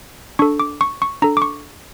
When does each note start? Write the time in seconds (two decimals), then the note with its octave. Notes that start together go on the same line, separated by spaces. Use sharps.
0.39 D4 A4 C#6
0.60 D6
0.81 C#6
1.02 C#6
1.22 D4 A4 A#5
1.37 D6
1.42 C#6